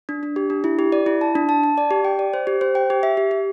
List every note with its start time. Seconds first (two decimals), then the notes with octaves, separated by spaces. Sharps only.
0.09 D4
0.23 D4
0.36 G4
0.50 D4
0.64 E4
0.79 G4
0.92 D5
1.06 E4
1.21 A5
1.35 D4
1.49 A5
1.64 A5
1.78 D5
1.91 G4
2.05 G5
2.19 D5
2.34 C5
2.47 G4
2.61 C5
2.75 G5
2.90 G4
3.03 E5
3.17 G4
3.31 G4